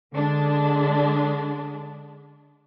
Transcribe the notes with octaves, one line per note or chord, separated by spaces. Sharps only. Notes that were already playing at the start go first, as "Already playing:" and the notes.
D3 G#3 D4